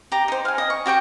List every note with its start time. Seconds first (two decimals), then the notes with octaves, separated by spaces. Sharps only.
0.12 G4 A#5
0.28 D#4 C5
0.45 F5 G#5
0.58 D#5
0.70 C#6
0.86 F#4 G4 G5 C#6